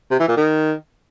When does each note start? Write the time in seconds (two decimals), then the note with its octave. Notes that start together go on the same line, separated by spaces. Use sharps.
0.11 C3
0.19 E3
0.28 A#2
0.37 D#3